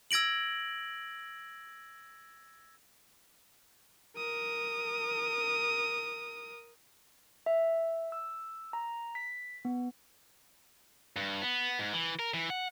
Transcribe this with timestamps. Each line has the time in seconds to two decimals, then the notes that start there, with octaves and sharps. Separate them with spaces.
0.11 E6 G#6 A#6 D7 F#7
4.17 A#4 D#6
7.46 E5
8.12 E6
8.73 A#5
9.15 B6
9.65 B3
11.16 G2
11.42 B3
11.79 G#2
11.93 E3
12.19 A#4
12.34 E3
12.50 F#5